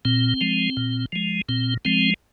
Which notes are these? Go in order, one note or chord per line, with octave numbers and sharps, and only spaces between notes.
A#2 C4
F3 G#3
A#2
F3 G#3
A#2 C4
F3 G#3 C4